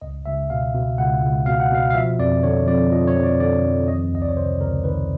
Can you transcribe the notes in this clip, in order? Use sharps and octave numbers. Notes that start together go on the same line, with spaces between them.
C#2 D#5
C#2 E5
B2 F5
B2
C#2 F#5
C#2
B2 F5
F#5
B2 F5
F5
F3 E5
F2 D5
D3 C#5
F2 D5
F3 D#5
C#5
F2
D5
D3 D5
F2
D#3 D#5
C#2 D#5
D5
C#5
C3 C5
C#2 A#4
D#3 B4